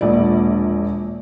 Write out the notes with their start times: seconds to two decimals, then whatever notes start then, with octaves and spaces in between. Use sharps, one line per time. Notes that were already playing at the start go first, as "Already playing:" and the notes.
0.01 E1 A#1 D5